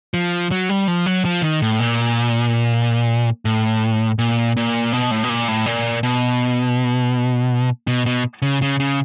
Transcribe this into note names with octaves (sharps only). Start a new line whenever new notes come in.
F3
F#3
G3
F3
F#3
F3
D#3
A2
A#2
A2
A#2
A#2
B2
A2
B2
A#2
A2
A#2
B2
B2
B2
C#3
C#3
C#3